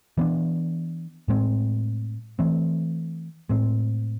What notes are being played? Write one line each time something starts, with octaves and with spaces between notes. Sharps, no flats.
E3 B3 D4
A2 G#3 C4
E3 A3 C4
A2 G#3 C4